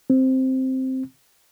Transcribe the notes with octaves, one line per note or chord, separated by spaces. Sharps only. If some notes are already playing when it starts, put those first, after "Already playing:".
C4